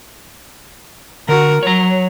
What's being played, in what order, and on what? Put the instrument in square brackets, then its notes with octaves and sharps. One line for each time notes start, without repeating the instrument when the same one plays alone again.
[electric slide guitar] D3 [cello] F#4 A#4
[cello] F#3 [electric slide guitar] C#5 A#5